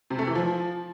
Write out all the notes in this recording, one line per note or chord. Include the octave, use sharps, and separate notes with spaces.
C3
A3
E3
F3